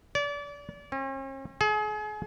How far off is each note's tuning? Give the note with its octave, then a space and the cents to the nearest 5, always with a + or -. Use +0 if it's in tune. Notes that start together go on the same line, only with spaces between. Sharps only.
D5 -30
C#4 -45
G#4 +35